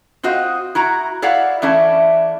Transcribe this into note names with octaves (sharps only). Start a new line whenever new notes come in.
C4 F4 F#4 C5 D#5
E4 F#4 A#5
E4 C#5 D5 F5 F#5
E3 A3 C#4 D4 E4